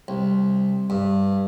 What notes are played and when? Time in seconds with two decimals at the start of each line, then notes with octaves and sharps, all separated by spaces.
0.08 C2
0.90 G2